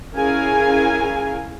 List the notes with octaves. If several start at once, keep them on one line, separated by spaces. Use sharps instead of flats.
C#4 E4 G#4 A#4 F5 G#5